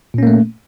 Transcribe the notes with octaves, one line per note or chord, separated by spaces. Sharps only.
A#2 A3 A#3 C#4